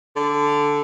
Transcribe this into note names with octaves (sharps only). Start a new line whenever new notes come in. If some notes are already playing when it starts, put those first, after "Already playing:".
D3